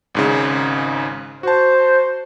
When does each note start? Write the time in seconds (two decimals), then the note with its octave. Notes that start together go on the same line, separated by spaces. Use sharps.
0.15 G#1 G#2 C#3
1.43 F#4 C5 A5